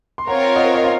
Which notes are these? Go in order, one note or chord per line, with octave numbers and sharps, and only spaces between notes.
C6
C4 F4 A#4 C#5 F#5 A#5
D#5 F#5
D#5
F5